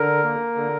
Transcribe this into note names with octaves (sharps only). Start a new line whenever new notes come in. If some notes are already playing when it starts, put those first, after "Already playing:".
Already playing: D3 A#4
A#3
D3